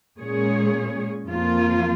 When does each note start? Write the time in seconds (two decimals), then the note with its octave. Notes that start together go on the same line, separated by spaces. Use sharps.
0.18 A#2 G#3 C#4 G#4 C#5
1.25 F2 F3 A#3 F4